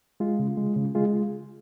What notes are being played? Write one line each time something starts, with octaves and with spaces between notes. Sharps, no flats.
G#3 F4
C#3
G#3
C#3
G#3 F4 G#4